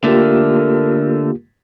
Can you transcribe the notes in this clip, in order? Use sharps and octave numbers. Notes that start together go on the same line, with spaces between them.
D3 A3 A#3 F4 G4 A#4